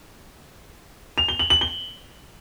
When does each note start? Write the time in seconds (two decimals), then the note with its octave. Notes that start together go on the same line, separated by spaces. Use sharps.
1.18 F7
1.28 G7
1.39 F#7
1.50 F#7
1.61 G7